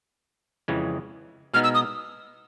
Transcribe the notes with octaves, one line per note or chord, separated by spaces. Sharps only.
F2 C#3 E3 G#3
B2 G#3 B3 D#4 F6
E6
D#6